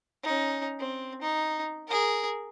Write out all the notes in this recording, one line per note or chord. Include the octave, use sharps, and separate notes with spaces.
C#4 D#4
C4
D#4
G#4 A#4